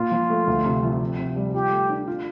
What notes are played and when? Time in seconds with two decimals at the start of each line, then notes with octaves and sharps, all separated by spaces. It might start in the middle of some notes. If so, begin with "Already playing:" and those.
Already playing: A#2 A#3 F4
0.11 F3
0.30 A3
0.47 D2
0.65 C3
0.83 F3
1.00 C4
1.18 C3
1.36 G3
1.54 F4 G4
1.72 A3
1.89 D4
2.07 F4